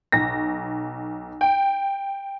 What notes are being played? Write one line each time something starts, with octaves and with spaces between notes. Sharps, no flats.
B1 A#6
G5